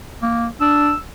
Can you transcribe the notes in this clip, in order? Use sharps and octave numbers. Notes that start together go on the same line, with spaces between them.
A#3
D4 E6